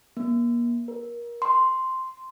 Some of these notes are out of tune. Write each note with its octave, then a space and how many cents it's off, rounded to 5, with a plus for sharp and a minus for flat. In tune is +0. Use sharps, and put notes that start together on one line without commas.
A#3 +35
A#4 +25
C6 -5